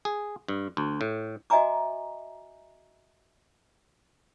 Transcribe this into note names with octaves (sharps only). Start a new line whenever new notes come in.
G#4
G2
D2
A2
F#4 D#5 E5 G#5 A#5 D6